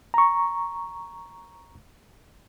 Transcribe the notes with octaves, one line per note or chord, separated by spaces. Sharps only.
A#5 C#6